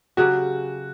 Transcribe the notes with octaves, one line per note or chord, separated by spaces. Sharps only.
C#3 F#3 C#4 F#4 G4